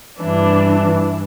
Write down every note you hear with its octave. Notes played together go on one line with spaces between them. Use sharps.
G2 E3 D4